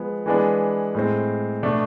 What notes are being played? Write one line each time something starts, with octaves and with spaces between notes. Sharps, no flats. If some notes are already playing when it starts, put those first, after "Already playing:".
Already playing: F3 G#3 B3
E3 G#3 B3 D4
A2 G#3 C4
B2 A3 D4